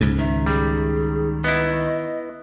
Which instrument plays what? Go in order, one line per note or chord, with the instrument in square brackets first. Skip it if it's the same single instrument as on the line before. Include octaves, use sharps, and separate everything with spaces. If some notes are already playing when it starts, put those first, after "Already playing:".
[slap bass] C#2 G#2
[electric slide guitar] D#3 [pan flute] E5
[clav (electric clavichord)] G3 [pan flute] G#4
[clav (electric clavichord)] B3 E4 [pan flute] D#5